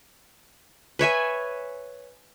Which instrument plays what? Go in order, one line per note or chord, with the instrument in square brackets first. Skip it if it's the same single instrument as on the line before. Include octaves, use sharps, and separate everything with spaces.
[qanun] B4 C#5 E5 G#5